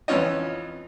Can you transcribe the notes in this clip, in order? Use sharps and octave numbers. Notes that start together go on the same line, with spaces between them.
F2 E3 C#4 F4 C#5 D#5